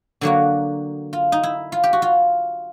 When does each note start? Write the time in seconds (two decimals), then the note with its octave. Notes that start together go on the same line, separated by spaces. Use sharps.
0.21 D3 F#3 A#3 F#4
1.13 F4
1.32 D#4
1.43 E4
1.72 F4
1.84 G4
1.93 F#4
2.02 F4